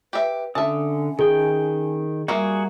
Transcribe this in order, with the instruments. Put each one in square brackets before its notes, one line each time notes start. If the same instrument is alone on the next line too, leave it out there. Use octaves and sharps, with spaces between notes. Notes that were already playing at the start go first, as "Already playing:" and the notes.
[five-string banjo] G4 E5 [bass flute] B4
[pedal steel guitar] D3 D#6 [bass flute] C#4 [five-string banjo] E5 A5
[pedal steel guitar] D#3 G5 [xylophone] G#4
[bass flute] G3 [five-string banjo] A#3 A#4 E5 [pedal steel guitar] F#4 G#4